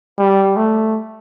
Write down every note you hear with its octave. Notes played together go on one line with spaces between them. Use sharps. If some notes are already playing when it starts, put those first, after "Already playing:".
G3
A3